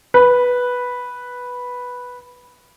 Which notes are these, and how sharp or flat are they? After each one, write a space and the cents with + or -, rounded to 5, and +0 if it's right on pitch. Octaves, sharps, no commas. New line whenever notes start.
B4 -5